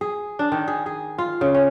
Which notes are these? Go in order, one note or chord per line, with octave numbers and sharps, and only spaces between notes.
G#4
D4
D#3
G#4
G#4
F4
C#3
C#4